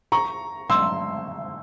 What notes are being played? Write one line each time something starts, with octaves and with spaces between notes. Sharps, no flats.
A#5 C#6
C6 E6